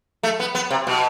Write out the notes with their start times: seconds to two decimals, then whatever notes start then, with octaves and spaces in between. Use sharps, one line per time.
0.23 A3
0.40 B3
0.55 B3
0.71 C3
0.87 B2